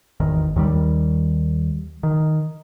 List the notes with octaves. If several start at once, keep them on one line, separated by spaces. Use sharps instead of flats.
G#1 E2 D#3
D#2 D#3 G3
D#3